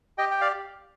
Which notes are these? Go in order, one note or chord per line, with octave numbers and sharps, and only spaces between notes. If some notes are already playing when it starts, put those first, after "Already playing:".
G4 D#5 G5
G5
D5 F5